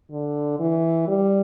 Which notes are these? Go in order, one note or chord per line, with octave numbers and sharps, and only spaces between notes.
D3
E3
G3